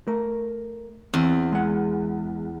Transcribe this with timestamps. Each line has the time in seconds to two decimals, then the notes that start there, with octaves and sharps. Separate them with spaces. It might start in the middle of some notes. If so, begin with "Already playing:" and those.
0.07 A3 A#4
1.14 E2 C4
1.52 G#3 F#5